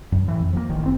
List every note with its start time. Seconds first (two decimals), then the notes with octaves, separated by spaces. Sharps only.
0.12 F#2
0.28 A2 E3
0.41 F2
0.53 F3 F#3 A#3
0.70 D#1 A1 D#3
0.83 F#1 C4